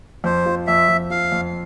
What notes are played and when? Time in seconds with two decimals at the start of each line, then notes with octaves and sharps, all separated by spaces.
0.24 F2 C5
0.46 F3
0.67 F2 E5
0.89 F2
1.10 F3 F5
1.32 F2